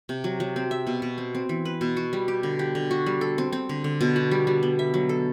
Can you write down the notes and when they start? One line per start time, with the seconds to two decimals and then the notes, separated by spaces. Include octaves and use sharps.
0.09 C3
0.24 F#3
0.40 F#3
0.56 C4
0.71 E5
0.87 B2
1.02 B2
1.18 C4
1.35 C4
1.49 E3
1.65 B4
1.81 B2
1.97 F#4
2.13 G3
2.28 G4
2.43 D3
2.59 G4
2.75 D3
2.91 F#4
3.06 G3
3.21 A4
3.38 C4
3.53 C4
3.69 D3
3.84 D3
4.01 B2
4.16 F#4
4.31 G3
4.47 G3
4.63 B3
4.79 E5
4.94 F#3
5.09 A4